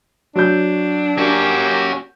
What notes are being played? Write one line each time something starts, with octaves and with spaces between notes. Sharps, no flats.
F#3 D4 G6
A#3 C#4 F#4 G4 E6